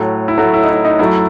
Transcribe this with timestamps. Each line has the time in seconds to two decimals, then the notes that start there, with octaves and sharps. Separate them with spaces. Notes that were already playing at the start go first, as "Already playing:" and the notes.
Already playing: A2 F#3 A3
0.28 E4
0.38 A2 F#3 A3 F#4
0.53 E4
0.63 D#4
0.69 E4
0.85 D#4
0.99 F#2 F#3 A3 E4